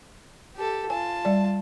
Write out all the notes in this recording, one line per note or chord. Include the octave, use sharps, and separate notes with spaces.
G4 A4
F4 G#5 A5
G3 D5